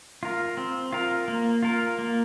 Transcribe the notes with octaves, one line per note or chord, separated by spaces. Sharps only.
F4 A#4
C4
F4 A#4
A#3
F4 A#4
A#3